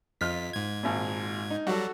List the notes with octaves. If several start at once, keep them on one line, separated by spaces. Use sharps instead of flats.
F2 F4 D#5 F6 B6
G#2 G#6
G#1 A#2
D#4
F#3 G3 F#4 A4